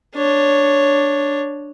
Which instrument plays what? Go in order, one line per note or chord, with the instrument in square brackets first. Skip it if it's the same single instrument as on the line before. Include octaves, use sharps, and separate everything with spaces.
[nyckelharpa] D4 C#5